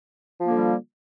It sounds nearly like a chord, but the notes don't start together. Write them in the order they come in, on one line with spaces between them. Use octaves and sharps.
F3 A#3 D3 G3